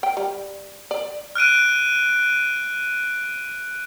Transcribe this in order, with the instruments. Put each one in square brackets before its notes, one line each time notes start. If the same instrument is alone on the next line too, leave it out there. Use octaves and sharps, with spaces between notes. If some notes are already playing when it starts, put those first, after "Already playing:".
[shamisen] G5
G3
D5
[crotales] F6 F#6 D7 D#7